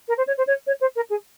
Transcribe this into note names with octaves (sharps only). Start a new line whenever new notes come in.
A#4
C5
C#5
C5
C#5
C#5
C5
A#4
G#4